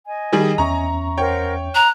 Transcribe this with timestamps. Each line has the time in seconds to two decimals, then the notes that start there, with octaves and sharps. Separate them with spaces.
0.06 D#5 G#5
0.33 D#3 G3 G#4
0.58 E2 C#4 E5 A#5 C#6
1.18 A#4 C5 C#5 F#5 G5
1.75 A#5 F#6